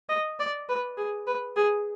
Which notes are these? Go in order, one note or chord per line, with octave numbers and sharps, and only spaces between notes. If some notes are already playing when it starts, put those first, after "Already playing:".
D#5
D5
B4
G#4
B4
G#4